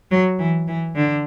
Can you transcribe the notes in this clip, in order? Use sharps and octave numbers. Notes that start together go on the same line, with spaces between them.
F#3
E3
E3
D3